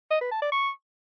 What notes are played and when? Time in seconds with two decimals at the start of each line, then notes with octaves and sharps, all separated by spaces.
0.11 D#5
0.21 B4
0.31 A5
0.42 D5
0.52 C#6